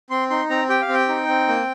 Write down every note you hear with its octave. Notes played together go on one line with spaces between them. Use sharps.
C4 C6
D#4 C6
C4 A#5
G4 G5
F5
C4
G5
D#4
C4
A#3